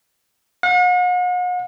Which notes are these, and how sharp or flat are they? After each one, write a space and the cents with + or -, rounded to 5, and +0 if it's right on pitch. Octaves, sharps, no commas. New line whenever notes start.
F#5 -45